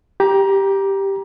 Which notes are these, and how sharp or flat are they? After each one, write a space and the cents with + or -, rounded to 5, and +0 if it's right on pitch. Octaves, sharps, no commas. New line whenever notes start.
G4 +0 A#5 +25